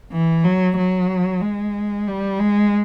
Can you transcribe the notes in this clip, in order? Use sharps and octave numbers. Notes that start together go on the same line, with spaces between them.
E3
F#3
F#3
G#3
G3
G#3